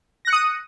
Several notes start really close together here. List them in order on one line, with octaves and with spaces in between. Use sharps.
A#6 F#6 C#7 D#6 D#7